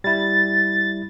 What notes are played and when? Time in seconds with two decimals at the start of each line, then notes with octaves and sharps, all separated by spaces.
0.04 G3 E4 A6